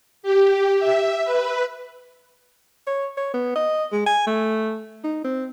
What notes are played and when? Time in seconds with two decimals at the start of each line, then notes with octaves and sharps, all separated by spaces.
0.23 G4
0.80 E5
1.25 B4
2.87 C#5
3.17 C#5
3.34 B3
3.55 D#5
3.92 G#3
4.06 G#5
4.27 A3
5.04 D#4
5.24 C4